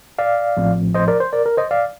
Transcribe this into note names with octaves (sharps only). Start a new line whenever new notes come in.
D5 F5
A1 A2 F3 A3 C4
C5 D#5
A#4 D5
C5
A#4 D5
A#4
C5 D#5
D5 F5